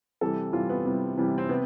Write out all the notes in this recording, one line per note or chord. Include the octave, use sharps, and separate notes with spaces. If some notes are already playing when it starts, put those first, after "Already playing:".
C3 E3 G3 A4
C3 E3 G3 F4
B3
C3 E3 G3
C3 E3 G3
C4
C3 B3